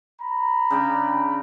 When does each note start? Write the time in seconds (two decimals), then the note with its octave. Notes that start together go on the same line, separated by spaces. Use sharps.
0.21 A#5 B5
0.70 C#3 D4 G5